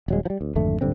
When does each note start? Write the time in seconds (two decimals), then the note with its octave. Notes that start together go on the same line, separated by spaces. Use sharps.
0.08 D#1 F#3 G#3
0.25 F3 G3
0.41 D2
0.55 G#1 F2 D3 A3
0.81 D1 G2 D3 C4